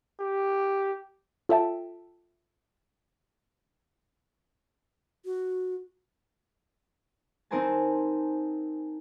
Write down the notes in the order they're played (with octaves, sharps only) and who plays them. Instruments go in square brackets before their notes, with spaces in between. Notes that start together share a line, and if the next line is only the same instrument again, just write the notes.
[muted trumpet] G4
[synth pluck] F4 A4 C#5 E5 G5 A5
[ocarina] F#4
[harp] C4 D#4 A#4 C5 G#5 A5